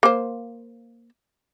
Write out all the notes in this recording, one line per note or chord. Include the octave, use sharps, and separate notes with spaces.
A#3 C5